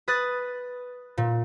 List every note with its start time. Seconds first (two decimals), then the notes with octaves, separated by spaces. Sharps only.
0.08 B4 D#6 F#6 A6
1.18 A#2